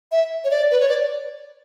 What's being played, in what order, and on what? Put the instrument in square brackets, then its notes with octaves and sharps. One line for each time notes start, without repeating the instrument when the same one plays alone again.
[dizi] E5
C#5
D5
B4
C#5
D5